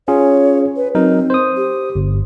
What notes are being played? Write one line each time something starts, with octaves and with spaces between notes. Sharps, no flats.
C#4 F4 G#4 C#5
B4
F#3 C4 D#4 A#4
C5 D#6
G4
G1